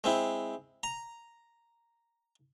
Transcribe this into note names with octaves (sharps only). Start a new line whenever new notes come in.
G#3 C4 E4
A#5